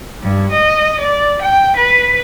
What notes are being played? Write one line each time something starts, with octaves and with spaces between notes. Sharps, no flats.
G2
D#5
D5
G5
B4